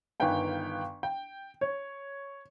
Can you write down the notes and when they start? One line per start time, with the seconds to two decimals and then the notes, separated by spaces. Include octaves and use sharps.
0.20 G1 D#3 B4 F5 G5 G#5
1.03 G5
1.61 C#5